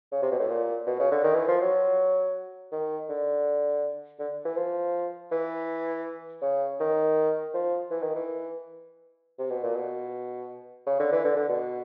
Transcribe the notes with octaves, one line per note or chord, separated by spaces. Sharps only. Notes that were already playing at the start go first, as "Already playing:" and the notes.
C#3
C3
B2
A2
A#2
B2
C#3
D3
D#3
E3
F3
F#3
D#3
D3
D3
E3
F3
E3
C#3
D#3
F3
E3
D#3
E3
C3
B2
A#2
B2
C#3
D3
E3
D3
D3
B2